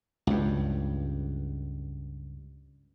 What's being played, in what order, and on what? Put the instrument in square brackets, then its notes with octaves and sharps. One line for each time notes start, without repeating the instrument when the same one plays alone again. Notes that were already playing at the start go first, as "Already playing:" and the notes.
[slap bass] C#2 G2